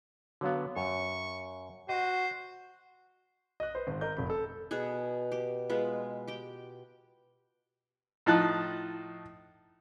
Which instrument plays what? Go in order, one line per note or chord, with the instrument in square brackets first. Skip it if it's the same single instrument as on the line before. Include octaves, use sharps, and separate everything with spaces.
[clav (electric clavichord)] D3 F#3 B3 [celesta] F#4 C#5 F5
[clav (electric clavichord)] F#2 [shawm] C#6
[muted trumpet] F#4 [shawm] C5 [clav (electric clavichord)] D#5
[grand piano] D#5 F#6
B4 C5
G#1
A#4 D#5 G6
F1 B5
A4
[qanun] B2 B3 F#4 G#4
G4
G#3 B3 F4 B4
G4 G5
[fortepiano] A2 F3 D#4 A5 F#6